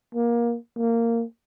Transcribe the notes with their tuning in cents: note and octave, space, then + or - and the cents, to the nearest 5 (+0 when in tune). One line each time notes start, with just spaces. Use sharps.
A#3 +20
A#3 -15